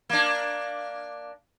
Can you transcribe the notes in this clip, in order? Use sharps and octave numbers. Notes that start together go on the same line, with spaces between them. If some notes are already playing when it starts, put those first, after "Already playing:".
A#3 D4